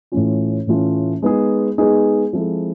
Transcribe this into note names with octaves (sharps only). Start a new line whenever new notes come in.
A2 E3 A3 C#4 F4
A2 E3 A3 C#4 F4
G#3 B3 D#4 G#4
G#3 B3 D#4 G#4
F3 G#3 C4 E4 A4